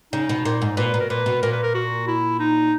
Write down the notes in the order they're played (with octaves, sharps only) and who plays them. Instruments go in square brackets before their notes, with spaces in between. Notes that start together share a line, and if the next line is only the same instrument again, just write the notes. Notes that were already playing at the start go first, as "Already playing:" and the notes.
[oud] C#3 [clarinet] D#4
[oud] B2
[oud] A#2 [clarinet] D#4
[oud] G#2
[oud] A#2 [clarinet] B4
[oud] B2
[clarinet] A#4
[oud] A#2 [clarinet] B4
[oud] B2
[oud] A#2 [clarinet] A#4
[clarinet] B4
A#4
F#4
E4
D#4